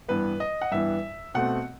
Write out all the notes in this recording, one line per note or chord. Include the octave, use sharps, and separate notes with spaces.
G2 E3 B3 B4
D#5
F#5
G2 E3 B3 E5
B2 A3 C4 F#5